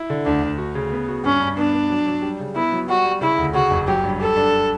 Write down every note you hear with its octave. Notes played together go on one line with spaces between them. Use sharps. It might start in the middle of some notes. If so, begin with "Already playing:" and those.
Already playing: E4
D3
D2 D4
D2
F#4
C#3
B3
F#4
G2 C#4
G2
B3 D4
B3
F#3
F#3
G3
C#3
B3 E4
F#3
G3 F#4
G3
C#3 E4
D2
C#3 F#4
F#1
F#3 G4
G2
G4 A4
D4